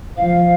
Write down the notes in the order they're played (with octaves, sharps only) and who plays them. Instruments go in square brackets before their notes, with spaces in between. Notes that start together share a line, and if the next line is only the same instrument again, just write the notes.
[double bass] F3 [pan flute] F5